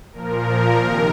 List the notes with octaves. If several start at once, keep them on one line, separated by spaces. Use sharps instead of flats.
A#2 F3 A#4
C3 D#3